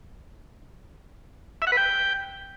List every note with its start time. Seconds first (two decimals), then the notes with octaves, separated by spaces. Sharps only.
1.62 E5
1.67 F#5
1.72 B4
1.77 G5